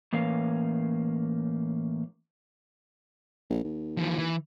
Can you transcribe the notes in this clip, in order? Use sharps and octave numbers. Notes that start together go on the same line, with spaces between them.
A2 E3 A#3 C#4 F5
A#1
D#2
E3 F3
E3